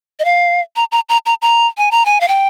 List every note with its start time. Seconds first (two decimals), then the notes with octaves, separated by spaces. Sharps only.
0.19 D#5
0.25 F5
0.76 A#5
0.92 A#5
1.09 A#5
1.26 A#5
1.42 A#5
1.78 G#5
1.91 A#5
2.06 G#5
2.21 F5
2.28 G5